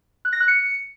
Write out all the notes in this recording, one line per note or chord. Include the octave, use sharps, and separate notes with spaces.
F#6
A#6
F#6
C#7